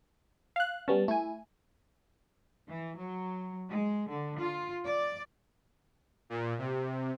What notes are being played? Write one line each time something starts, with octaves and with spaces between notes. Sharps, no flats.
F5 F#6
G3 B3 C#4 A5
A3 E4 G#5
E3
F#3
G#3
D3
F4
D5
A#2
C3